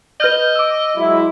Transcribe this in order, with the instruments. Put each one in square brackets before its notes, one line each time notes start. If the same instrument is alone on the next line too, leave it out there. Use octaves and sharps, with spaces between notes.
[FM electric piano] B4 F6 G6 [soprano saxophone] D#5
[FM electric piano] D6 E6
[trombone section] F#3 G#3 E4